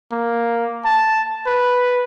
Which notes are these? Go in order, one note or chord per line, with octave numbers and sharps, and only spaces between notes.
A#3
A5
B4